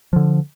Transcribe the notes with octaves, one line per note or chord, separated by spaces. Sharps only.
D3 F3